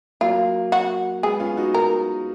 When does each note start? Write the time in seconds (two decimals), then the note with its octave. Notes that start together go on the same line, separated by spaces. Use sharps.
0.21 F#3 A#3 F4
0.72 F#4
1.23 G#3 B3 G#4
1.40 C#4 F4
1.57 D#4 F#4
1.74 A#4